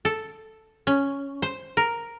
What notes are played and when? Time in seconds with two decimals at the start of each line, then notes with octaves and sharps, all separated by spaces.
0.05 A4
0.87 C#4
1.42 C5
1.77 A#4